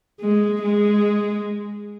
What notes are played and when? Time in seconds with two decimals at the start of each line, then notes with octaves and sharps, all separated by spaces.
0.20 G#3
0.62 G#3